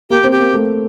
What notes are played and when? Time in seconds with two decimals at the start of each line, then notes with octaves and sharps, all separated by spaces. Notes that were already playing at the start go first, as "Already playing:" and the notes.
0.10 A#3 G4
0.24 C4
0.31 G4
0.40 A#3
0.54 A3